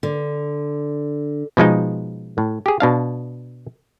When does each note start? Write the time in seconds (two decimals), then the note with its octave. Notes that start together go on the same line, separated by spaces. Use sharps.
0.03 D3
1.57 B2 F3 G#3 D#4
2.38 A2
2.66 G4 G#4
2.80 B2 D4 F5